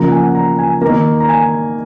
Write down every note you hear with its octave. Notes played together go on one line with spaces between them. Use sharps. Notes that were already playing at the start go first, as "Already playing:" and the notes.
Already playing: C#3 F3 A#3 A#5
F#5
G#5
A#5
G#5
D#3 A#3 A#5
A#5
G#5